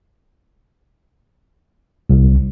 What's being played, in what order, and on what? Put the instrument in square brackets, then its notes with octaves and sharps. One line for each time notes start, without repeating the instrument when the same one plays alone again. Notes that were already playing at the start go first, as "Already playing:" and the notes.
[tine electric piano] C2